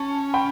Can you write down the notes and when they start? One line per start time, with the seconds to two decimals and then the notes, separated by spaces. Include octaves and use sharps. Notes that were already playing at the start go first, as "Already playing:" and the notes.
Already playing: C#4 A5 C#6
0.34 G5 B5